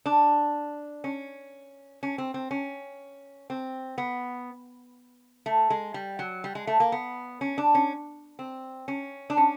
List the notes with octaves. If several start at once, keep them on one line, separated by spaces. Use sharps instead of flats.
D4
C#4
C#4
C4
C4
C#4
C4
B3
A3
G#3
G3
F#3
G3
G#3
A3
A#3
B3
C#4
D4
C#4
C4
C#4
D4
C#4